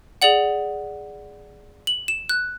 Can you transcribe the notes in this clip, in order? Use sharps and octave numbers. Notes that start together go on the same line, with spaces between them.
G#4 D5 F#5 F#7
F#7
E7
F#6